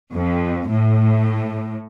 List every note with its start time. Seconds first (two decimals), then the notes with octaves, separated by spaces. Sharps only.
0.13 F2
0.69 A2